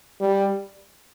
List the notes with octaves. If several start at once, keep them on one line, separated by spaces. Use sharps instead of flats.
G3